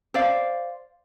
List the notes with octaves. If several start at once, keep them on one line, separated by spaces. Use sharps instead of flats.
C5 D5 F5